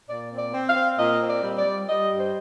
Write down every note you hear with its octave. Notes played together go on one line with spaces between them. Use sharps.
A#2 D5
C4
D5
C4
F5
C4
A#2 D#5
C4
D5
G3
D5
G3
G3 D#5
G2
C5